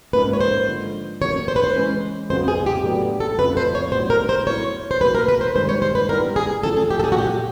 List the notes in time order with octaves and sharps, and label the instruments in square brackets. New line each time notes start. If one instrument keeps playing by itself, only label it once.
[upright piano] G#2 F3 A#3 C#4 [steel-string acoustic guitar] B4
[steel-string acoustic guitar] C#5
C5
[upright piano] D3 F3 G#3
[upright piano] E2 C#3 F#3 A#3 [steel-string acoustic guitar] C#5
[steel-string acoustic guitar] C5
B4
C5
[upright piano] E3 G#3 C#4
[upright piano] F2 C#3 F#3 B3 [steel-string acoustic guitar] C5
[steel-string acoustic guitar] G#4
G4
[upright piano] A2 F#3 B3 D4 G4
[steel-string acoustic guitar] A4
[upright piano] F2 C#3 F3 A3 [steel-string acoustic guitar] B4
[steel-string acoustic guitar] C5
C#5
[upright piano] A2 F#3 B3 D4 G4 [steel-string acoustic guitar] C5
[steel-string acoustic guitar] A#4
C5
[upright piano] F#3 B3 E4 [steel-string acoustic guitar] C#5
[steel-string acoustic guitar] C5
[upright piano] B2 F#3 A#3 [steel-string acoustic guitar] B4
[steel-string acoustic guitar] A#4
B4
C5
[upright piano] G2 D#3 G#3 [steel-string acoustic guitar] C5
[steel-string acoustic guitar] C#5
C5
B4
[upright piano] G3 B3 E4 [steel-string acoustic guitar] A#4
[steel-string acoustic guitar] G#4
[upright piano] E2 C#3 F3 A3 [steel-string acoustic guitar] A4
[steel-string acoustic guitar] G#4
G4
A4
G#4
F#4
[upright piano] A#2 F#3 A3 [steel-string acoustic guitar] G4